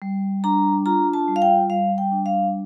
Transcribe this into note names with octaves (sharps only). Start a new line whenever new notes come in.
G3
D4 A#5
F4 A#5
A5
G3
F5
G5
G3 F5
G5
D4
F5